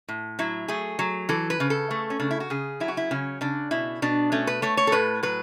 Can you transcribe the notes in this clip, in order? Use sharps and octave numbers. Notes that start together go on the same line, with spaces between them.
A2
F#3 E4
A3 G#4
F#3
E3 A4
B4
C#3
A4
A3
C#4
C#3 D4
E4
F#4
C#3 G#4
F#3 E4
F#4
E4
C#3 C#4
C#3 D4
B2 E4
B2 D4
A3 C#4
B4
A3 C#5
C#5
A4
A2 B4
F#3 B4